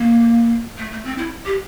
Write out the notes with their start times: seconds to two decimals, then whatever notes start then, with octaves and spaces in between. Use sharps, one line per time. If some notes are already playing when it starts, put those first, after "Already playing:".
Already playing: A#3
0.78 A3
0.92 A3
1.05 C4
1.18 E4
1.46 G4